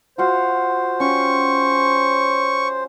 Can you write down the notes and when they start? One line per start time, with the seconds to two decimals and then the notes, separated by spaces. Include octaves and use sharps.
0.18 F4 F#4 C5 F5
1.00 C#4 F4 G4 C#6